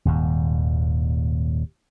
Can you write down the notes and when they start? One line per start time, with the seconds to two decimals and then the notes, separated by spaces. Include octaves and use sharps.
0.05 D#1 D#2 G#2